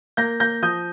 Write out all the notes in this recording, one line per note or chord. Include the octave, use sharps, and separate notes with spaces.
A#3 G6 A#6
A#3 G6 A#6
F3 D#6 G6